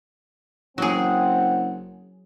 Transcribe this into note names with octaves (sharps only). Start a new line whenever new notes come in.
F#1 F#3 C4 G#4 F#5